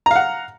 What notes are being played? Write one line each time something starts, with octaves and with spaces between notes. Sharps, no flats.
F5 F#5 A#5